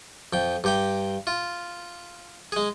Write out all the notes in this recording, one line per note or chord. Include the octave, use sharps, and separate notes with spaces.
F2 G5
G2 G4 G5
F4
G#3 G#4